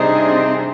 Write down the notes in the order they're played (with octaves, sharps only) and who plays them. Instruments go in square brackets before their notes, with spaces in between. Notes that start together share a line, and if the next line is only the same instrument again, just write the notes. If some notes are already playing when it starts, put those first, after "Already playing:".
Already playing: [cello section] C3 G3 D4 G#4 C5 [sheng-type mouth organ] D#4